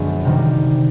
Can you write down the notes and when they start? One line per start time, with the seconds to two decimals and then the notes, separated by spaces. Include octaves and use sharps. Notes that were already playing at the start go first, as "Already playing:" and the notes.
Already playing: B1 F#2 D3 F3 G#3 B3
0.25 C3 D#3 G3